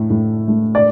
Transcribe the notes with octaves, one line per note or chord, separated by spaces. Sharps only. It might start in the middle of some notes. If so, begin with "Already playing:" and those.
Already playing: A2 A3
A2
A3
D5